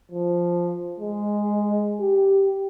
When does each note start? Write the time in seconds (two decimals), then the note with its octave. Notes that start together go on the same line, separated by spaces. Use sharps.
0.12 F3
1.00 G#3
2.00 G4